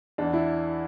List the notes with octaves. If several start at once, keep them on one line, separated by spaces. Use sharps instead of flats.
E2 D4
E4